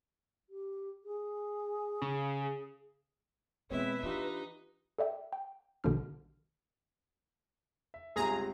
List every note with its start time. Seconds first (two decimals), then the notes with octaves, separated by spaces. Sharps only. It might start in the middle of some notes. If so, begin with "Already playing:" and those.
0.49 G4
1.04 G#4
2.02 C#3
3.71 B2 E3 G#3 C4 E4 B4 C#5 E5
4.03 E3 D4 D#4 F4 G4
4.99 A4 D5 E5 G5
5.33 G5
5.84 A#1 B2 D3 D#3 D4 F6
7.94 E5
8.16 G1 C#2 C3 G#4 A#5